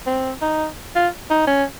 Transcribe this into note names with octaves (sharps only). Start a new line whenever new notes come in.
C4
D#4
F4
D#4
C#4